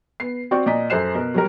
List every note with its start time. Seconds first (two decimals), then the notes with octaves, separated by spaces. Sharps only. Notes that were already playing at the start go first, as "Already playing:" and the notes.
0.20 B3 C7
0.51 C4 F#4 D5 G5 C#6
0.66 A#2 D5 D#5 A#5 B6
0.90 F#2 A4 C5 F#6 C7 E7
1.15 B2 A#4
1.34 F#3 G3 A#4